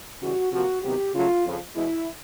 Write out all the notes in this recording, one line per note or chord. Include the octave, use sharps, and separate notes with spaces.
C#3 E3 G3 F#4
C3 F3 A#3 F#4
C3 D#3 F#3 B3 G4
C#3 F#3 A3 F4
F2 C#3 F3
E2 B2 G#3 B3 E4